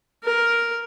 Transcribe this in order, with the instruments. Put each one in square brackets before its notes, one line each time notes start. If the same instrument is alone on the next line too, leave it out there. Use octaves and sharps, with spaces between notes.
[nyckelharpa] A#4